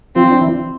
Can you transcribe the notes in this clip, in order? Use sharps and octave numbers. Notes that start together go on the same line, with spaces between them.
F3 C4 F4
D4
E3 E4